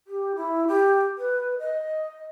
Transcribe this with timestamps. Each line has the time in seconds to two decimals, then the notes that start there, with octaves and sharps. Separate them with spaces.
0.07 G4
0.36 E4
0.67 G4
1.18 B4
1.59 D#5